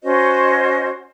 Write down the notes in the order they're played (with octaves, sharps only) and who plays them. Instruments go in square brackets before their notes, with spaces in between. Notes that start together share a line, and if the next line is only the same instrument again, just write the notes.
[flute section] C#4 F#4 C5 D#5